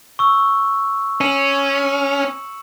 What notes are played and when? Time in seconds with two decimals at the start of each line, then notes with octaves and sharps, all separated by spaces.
0.19 C#6 E6
1.21 C#4 C#7 E7 F#7